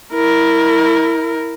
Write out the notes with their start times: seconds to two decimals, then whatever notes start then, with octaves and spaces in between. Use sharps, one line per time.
0.14 E4 A#4